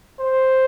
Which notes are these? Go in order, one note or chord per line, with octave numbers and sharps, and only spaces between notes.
C5